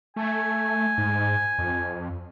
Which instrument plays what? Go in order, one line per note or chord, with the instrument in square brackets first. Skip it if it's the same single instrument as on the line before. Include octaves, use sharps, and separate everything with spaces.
[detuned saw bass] A3 [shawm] G#5
[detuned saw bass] G#2
F2